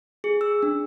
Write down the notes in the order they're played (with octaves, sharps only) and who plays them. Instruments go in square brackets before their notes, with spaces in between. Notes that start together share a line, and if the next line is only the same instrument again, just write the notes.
[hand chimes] G#4
E6
D4